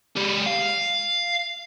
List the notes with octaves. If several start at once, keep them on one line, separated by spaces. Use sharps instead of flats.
G#3 G4
F5